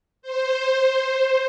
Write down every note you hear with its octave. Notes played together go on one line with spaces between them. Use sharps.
C5